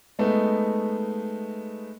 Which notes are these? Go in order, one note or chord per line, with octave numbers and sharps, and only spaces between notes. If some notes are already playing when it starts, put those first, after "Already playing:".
G#3 A3 B3 D#4